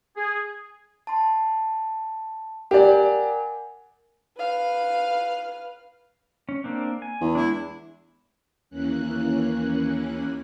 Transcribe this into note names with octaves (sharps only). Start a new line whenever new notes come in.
G#4
A5 C6
G4 A#4 D5 F#5 G#5
B4 F5
C#4
A#3 C4 D4
G#5
E2
G#3 D4 E4
D#2 E3 A#3 C#4 F#6